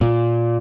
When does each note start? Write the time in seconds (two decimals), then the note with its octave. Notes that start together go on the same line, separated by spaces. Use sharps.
0.01 A#2